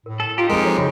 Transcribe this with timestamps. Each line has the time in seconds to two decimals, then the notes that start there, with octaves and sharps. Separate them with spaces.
0.06 A2 A#4
0.20 A4
0.38 D#4 F4 G4 A#5
0.50 F2 G#3 A#4
0.65 F3 A4 C#5
0.77 C#3 F#4